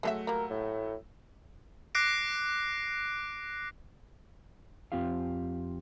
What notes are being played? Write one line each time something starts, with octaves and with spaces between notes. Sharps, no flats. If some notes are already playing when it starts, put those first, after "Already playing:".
F#3 G#3 A3 F#4 A4 E5
G3 A#3 A#4
A2
D6 F#6 A#6 C7 D7
F2 C4 F4 G4 F5